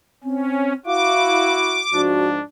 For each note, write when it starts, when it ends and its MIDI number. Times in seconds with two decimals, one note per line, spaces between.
0.24 0.74 60
0.24 0.73 61
0.86 1.81 64
0.86 1.81 66
0.86 1.54 77
0.86 2.01 86
1.92 2.41 44
1.92 2.41 53
1.92 2.41 62
1.92 2.27 66